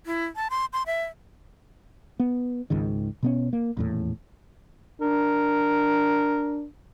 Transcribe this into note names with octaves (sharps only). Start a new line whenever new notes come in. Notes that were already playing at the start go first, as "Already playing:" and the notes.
E4
A5
C6
C6
E5
B3
G#1 C#2 G#2 D#3
B2 B3 C#4
A#3
D#1 E2 A2
D4 A#4